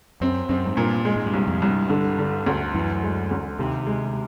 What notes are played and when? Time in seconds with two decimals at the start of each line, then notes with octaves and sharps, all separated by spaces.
0.21 F#2 C4
0.49 F#2 C4
0.66 G#2
0.77 G2 A#2
1.05 G#3
1.16 G#2
1.26 G2
1.34 C2
1.47 F2
1.62 C2
1.68 G2
1.89 G2 D3
2.18 D3
2.46 D2
2.74 F#2 E3
3.03 G#3
3.31 D2
3.59 D#2 C3
3.86 G#3